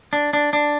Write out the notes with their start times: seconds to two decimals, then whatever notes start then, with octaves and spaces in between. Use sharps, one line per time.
0.13 D4
0.33 D4
0.53 D4